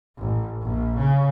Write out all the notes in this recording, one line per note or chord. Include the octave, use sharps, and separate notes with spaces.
A1
A#1
C#3